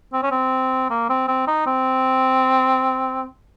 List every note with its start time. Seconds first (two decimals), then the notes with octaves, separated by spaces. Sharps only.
0.13 C4
0.23 C#4
0.31 C4
0.90 A#3
1.09 C4
1.28 C4
1.48 D#4
1.66 C4